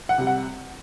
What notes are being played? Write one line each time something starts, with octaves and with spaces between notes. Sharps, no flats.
F#5
C3 G3
F#5